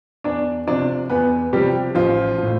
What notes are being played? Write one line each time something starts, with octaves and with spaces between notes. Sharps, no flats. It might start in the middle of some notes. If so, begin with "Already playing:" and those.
E2 D4 D5
C3 F3 D4 D5
E2 B3 B4
C3 F3 G3 G4
A1 F3 F4
A2 F3